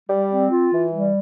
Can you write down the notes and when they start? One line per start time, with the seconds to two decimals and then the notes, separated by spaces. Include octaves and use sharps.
0.09 G3
0.30 C4
0.50 F4
0.73 E3
0.92 G3